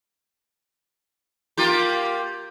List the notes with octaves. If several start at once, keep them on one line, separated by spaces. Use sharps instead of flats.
A#3 F4 G4